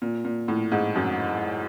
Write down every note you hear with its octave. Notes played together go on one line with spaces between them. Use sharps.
A#2
A#2
A2
G#2
F#2